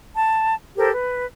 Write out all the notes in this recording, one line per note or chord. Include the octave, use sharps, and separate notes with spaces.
A5
G4 A4 A#4 C5
B4